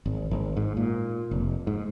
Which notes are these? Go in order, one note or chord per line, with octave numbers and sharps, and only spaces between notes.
G#1
G#1
G#2
A#2
F1
G#2